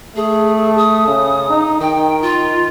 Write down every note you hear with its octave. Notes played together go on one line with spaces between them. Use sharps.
A3 G#4
D#6
C#3
D#4
D#3 G5
F4